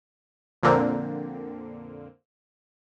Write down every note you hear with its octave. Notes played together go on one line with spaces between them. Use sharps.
F2 A#2 D3 A#3 C4